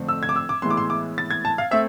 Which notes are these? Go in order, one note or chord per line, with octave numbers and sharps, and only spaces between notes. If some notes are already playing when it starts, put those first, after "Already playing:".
Already playing: F2 D3 A3 C4
E6
G#6
D6
E6
D6
A2 E3 G#3 B3 C6
D6
C6
D6
A6
G#6
A5
F5
A3 C4 E5